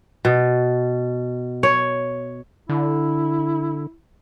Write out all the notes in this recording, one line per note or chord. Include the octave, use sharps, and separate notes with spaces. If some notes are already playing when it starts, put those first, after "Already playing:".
B2
C#5
D3 E4